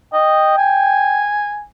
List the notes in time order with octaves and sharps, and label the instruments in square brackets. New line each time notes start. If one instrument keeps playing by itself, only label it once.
[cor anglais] D#5 [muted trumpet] G5
[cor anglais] G#5